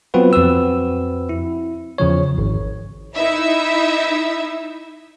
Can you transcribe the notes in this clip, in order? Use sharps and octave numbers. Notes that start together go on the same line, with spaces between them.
F#3 B3 C4 F4 F#4 B4
F2 C4 F#4 B4 E6
E4
E2 C#3 F3 C#5
G#1
D#4 E4 E5